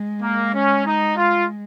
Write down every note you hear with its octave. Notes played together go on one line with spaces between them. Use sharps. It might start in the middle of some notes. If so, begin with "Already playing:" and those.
Already playing: G#3
A#3
C#4
D#4
F4